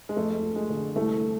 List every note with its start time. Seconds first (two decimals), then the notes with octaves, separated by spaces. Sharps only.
0.09 G#3
0.16 F2 A3
0.43 F3
0.56 G#3
0.70 D3
0.96 C2 A3